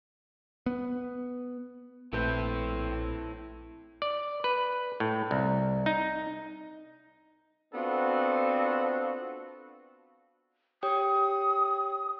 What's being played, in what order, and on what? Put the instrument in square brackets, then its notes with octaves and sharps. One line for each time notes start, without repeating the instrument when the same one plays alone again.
[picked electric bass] B3
[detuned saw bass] A#1 [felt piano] A3 B4 G6 [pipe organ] C4 [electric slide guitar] E4 A4
[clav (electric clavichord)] D5
B4
A2
C2
D#4
[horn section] B3 C4 D4 F4 F#4 A4
[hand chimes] G4 C#5 G5 [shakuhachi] D#6